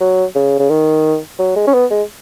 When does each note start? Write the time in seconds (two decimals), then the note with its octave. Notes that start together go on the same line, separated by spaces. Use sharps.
0.01 F#3
0.35 C#3
0.59 C#3
0.70 D#3
1.39 F#3
1.56 G#3
1.67 C#4
1.74 B3
1.91 G#3